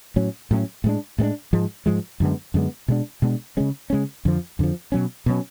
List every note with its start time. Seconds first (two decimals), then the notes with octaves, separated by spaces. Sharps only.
0.16 A2 F#3 C#4
0.51 A2 F#3 C#4
0.84 A2 G#3 B3 D4
1.18 A2 G#3 B3 D4
1.53 G#2 F3 G#3
1.86 G#2 F3 G#3
2.20 F#2 D3 G#3 B3
2.54 F#2 D3 G#3 B3
2.88 B2 G#3 D4
3.22 B2 G#3 D4
3.57 C#3 G#3 C#4
3.90 C#3 G#3 C#4
4.25 F2 D3 F3
4.59 F2 D3 F3
4.92 B2 F#3 C#4
5.26 B2 F#3 C#4